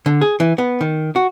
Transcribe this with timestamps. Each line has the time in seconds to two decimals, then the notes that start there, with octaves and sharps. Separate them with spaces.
0.06 D3
0.21 G#4
0.40 E3
0.58 B3
0.81 D#3
1.16 F#4